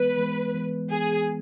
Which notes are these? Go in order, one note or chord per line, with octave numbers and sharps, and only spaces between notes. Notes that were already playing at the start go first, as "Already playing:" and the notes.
Already playing: E3 G#3 B3 B4
E3 G#3 B3
E3 G#3 B3
E3 G#3 B3 G#4